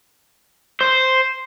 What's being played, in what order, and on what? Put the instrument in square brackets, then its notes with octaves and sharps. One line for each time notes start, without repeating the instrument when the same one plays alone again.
[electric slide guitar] C5